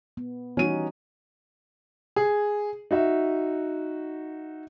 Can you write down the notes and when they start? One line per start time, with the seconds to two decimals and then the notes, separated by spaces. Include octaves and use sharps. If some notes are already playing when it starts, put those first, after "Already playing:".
0.17 B3
0.57 E3 G3 C#4 D#4 F#4 D#7
2.16 G#4
2.91 D#4 F#4 E5